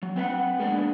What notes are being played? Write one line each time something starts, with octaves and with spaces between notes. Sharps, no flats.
F#3
C4 B4 E5 F#5
G#3 A#3 B3 D4